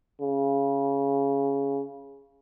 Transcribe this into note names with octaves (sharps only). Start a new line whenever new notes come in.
C#3